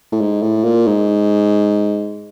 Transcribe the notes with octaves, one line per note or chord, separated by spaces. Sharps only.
A2
G#2
A2
A#2
G#2